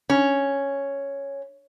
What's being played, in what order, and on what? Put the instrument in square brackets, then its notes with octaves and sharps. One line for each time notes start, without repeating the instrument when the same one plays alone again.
[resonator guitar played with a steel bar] C#4